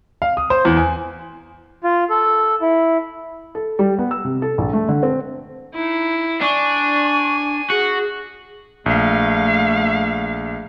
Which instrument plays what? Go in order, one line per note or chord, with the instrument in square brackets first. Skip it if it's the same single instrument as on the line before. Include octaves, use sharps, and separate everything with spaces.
[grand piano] F5
D#6
C5
E2
G#5
[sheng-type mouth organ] F4
A4
E4
[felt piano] A4
G3
B3
E6
C3
A4
A#1
A3
D3
C4
[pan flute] D#4 [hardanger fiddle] E4
[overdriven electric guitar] D4 [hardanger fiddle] G#5 [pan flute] C#6
[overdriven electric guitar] F#4 [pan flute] G#4
[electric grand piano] A#1 [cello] A3 F5